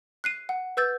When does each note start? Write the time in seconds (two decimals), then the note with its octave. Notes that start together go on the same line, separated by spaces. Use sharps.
0.24 F#6 C7 D#7
0.49 F#5
0.77 B4 E6 G6 A6